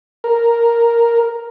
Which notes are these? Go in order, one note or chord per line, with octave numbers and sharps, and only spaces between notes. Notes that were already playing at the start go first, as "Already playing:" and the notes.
A#4